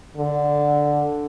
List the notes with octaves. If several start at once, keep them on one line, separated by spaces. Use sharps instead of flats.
D3